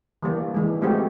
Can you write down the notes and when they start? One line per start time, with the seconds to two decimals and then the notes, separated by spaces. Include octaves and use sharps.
0.22 E3 G3 A#3
0.54 E3 G#3
0.81 F3 G#3 A3 C4 F#4 G4